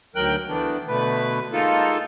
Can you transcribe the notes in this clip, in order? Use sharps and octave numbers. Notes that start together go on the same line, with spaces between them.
D2 D#3 F#3 A#4 G5 F#6
E3 A3 B3 D4
B2 D3 A3 B4
G#3 A#3 D#4 F4 A4